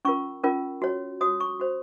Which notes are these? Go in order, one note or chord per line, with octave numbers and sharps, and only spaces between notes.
C#4 F4 A#4 C#6
C#4 F4 A#4
F#4 C#5
F#4 C#5 D#6
C#6
F#4 C5